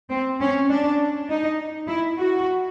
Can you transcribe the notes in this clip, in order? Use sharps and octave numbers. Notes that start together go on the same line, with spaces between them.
C4
C#4
D4
D#4
E4
F#4